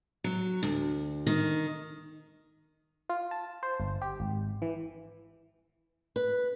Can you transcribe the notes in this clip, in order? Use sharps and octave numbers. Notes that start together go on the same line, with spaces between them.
F#3
D2
D#3
F4
A5
C5
G1
G4
G#1
E3
B4